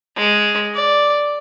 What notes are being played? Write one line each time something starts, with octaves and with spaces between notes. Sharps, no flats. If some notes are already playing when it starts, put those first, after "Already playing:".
G#3
D5